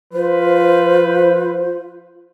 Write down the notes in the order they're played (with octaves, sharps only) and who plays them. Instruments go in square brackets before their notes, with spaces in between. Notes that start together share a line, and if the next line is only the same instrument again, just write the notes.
[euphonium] F3 [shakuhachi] F4 [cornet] B4 [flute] C5